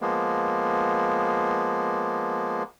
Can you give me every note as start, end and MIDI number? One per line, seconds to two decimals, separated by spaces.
0.01 2.63 53
0.01 2.63 56
0.01 2.63 58
0.01 2.63 59